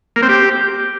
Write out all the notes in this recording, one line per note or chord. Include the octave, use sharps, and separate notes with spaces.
A#3
C4
G4